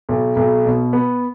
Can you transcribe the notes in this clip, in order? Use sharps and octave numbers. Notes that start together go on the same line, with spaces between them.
B1
B1
B2
B3